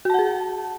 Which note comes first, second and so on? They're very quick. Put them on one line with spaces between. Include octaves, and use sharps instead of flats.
F#4 A5 F#5 G#4